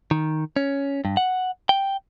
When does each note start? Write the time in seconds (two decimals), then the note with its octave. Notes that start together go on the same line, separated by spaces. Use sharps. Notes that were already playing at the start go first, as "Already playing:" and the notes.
0.11 D#3
0.56 C#4
1.05 G2
1.17 F#5
1.69 G5